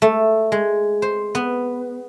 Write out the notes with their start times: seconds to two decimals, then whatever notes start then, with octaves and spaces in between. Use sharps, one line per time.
0.02 A3
0.52 G#3
1.02 C5
1.35 B3